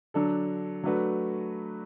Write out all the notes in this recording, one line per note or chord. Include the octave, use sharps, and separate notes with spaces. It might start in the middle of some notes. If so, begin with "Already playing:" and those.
D3 F#3 D4 A4
F#3 A3 D4 F#4 B4